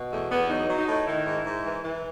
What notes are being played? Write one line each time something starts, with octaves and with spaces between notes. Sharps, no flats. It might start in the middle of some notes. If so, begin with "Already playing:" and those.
Already playing: B2
E2 A3
E2 B3
F#3 D#4
F#3
D#4
A2
D#3 E4
G#2
G#2
E3
E3